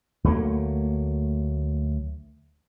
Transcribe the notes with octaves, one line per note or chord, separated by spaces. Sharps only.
D2 F#3 A3 A#3